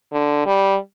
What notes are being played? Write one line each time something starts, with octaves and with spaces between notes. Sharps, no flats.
D3
G3